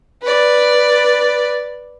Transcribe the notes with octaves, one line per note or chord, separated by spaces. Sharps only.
B4 D5